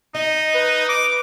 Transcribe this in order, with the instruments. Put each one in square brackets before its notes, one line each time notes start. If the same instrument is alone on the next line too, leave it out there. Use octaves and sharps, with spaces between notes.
[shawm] D#4 [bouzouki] D#5
[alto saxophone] B4
[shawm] D6